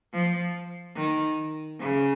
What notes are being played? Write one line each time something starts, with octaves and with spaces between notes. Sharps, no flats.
F3
D#3
C#3